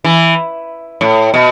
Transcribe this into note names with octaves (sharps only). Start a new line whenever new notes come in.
E3
A2
B2